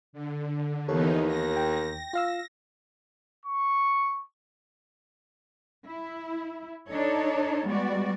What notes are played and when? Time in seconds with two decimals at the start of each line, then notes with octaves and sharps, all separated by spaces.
0.13 D3
0.88 D#2 E3 B3 D#4 A4 C#5
1.26 A#6
1.56 G5
2.13 F4 F5 E6
3.46 C#6
5.86 E4
6.89 D4 D#4 A4 C#5
7.67 G3 G#3 B3 F#4 D5